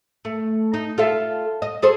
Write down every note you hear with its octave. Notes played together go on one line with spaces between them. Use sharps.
A3
D#4
F4 A4 E5
D#5
G#4 A4 C5